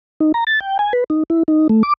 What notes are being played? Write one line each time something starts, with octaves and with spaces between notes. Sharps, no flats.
D#4
A#5
A6
G5
G#5
B4
D#4
E4
D#4
A3
D6